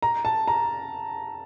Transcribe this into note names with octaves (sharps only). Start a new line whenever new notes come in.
A#5
A5
A#5